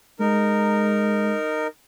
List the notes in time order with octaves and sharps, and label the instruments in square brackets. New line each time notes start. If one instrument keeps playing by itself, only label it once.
[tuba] G#3 [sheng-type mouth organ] D#4 A#4